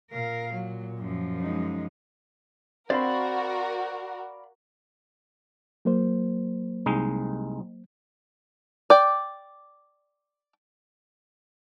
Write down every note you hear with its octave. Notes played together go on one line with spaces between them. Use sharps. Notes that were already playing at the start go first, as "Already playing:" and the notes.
A#2 A#4 F5
F#3
F#2 F3
G#3 D#4
C4 F#4 A#4 D5 F5 B5
F#3 A#3 C5
C2 G#3 D#4
D5 G5